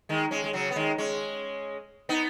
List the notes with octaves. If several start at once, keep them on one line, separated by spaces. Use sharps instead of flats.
D#3 G#3
G#3 C#4
G#3
C#3 F#3
B3
D#3 G#3
G#3 C#4
B3 D#4